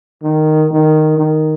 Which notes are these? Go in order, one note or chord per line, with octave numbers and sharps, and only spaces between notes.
D#3
D#3
D#3